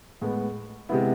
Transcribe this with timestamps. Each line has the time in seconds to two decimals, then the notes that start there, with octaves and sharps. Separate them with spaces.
0.21 A2 G#3 B3
0.89 C3 G#3 B3 E4